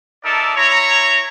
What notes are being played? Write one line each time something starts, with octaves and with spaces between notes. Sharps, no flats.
D#4 A4 A#4 D5 E5 A5
E4 C#5 A#5